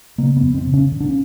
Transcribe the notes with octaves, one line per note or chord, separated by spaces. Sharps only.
C#3 A#3
B3
F2
C4
C#3
C#4
D3
D4
C#4